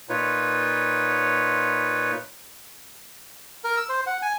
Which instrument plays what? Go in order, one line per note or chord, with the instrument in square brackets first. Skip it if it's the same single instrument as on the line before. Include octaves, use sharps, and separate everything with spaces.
[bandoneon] A#2 D#4 F4 B4 C#5
[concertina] A#4
E6
C5
F#5
G#5